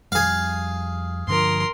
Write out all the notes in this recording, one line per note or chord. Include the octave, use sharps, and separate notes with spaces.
F2 G3 G#4 F5
G2 D3 F3 A#4 C6